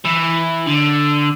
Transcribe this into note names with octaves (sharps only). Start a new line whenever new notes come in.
E3
D3